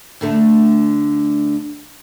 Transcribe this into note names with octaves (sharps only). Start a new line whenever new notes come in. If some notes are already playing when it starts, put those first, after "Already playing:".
D2 D3 A3